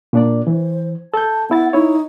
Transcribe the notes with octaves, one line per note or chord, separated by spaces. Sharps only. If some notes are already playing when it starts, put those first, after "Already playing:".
A#2 D4 D5
E3 C5
A4 A5 G6
B3 E4 F#5 A6
D#4 E4 C#5